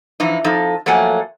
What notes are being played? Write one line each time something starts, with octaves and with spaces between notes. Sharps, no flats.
E3 F3 D#4
F2 F3 D#4 A4
F3 F#3 A3 A#3 F#5 G#5